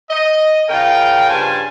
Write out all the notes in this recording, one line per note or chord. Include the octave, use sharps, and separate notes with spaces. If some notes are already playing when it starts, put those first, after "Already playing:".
D#5
C#3 F4 A#4 G5
G2 C#3 C5 G#5 A5